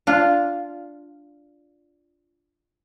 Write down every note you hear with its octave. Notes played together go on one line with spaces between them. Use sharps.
D4 F4